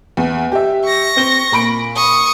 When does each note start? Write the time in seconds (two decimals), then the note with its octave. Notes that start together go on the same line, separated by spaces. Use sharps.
0.17 E2
0.52 G4 E5
0.85 C#6 A#6
1.16 C4 G7
1.52 A#2 B5 D7
1.96 C#6 D#6